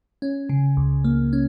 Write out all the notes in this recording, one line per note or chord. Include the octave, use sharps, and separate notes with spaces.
C#4
C#3
C#2
A#3
C#4